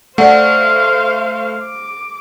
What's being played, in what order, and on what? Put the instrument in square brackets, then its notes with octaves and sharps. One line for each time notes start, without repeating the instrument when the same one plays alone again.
[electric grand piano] A3 [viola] C5 F5 [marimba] D5 F#5
[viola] D6